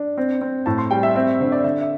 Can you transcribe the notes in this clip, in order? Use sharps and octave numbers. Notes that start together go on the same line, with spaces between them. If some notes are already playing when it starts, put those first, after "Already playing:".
Already playing: D4
C4
C4
A2 A5
C6
G3 G5
E5
C4 E5
D3 C5
D5
D3 E5
E5